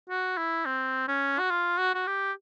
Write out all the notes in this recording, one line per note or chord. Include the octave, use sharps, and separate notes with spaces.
F#4
E4
C4
C#4
F#4
F4
F#4
F#4
G4